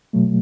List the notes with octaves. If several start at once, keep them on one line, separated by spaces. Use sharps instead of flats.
B2 F#3 A3